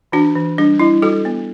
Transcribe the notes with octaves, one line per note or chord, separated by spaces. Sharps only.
E3 D4 F#4
E3
G3 D4
G3 E4
G3 F#4 A4
B3